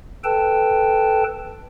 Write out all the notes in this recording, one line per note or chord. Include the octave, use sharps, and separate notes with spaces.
A4 B4 G5 A5